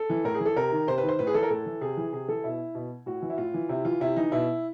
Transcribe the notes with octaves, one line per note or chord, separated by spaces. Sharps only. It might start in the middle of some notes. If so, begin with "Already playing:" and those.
Already playing: A4
E3
A2 A#4
G#4
E3
A4
C3 A#4
D#3
C3 C5
B4
D#3
C5
A2 B4
G#4
E3 A4
A#4
A2 A4
E3
C3 G#4
E3
C3 G#4
E3 A4
B2 E4
B2
A2 F#4
E3
E4
A2 F4
E3
C3 E4
E3 F4
C3 E4
E3 D#4
B2 E4